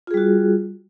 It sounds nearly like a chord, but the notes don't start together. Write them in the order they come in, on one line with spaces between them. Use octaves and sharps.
F4 G#4 G3 F#4